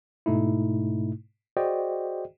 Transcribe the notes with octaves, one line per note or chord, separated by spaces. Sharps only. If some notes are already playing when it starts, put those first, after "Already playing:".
G#2 B2 A3 D#4 E4
F#4 G#4 C5 D5 D#5 G5